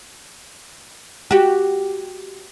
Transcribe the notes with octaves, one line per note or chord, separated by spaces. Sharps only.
F#4 G4